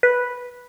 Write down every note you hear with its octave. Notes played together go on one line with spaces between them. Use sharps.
B4